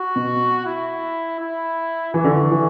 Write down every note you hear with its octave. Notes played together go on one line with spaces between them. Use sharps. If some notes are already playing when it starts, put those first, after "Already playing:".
Already playing: F#4
B2
E4
E4
E3 F#4
D3
E3
E3